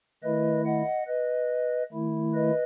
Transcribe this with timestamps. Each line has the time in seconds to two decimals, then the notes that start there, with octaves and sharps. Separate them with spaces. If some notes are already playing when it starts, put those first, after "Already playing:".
0.23 D#3 A3 E4 B4 D#5
0.66 D#5 F#5
1.07 B4 D#5
1.92 D#3 A3 E4
2.34 B4 D#5